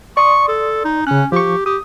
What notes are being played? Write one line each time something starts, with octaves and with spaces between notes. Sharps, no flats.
D5 C6 C#6 D#6
A4
D#4
C#3 C#4 F#6
F3 G4 C#6
G4 D#6